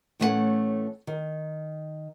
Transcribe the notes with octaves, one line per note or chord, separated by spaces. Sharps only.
A2 E3 A3 C#4 C5 F#5
D#3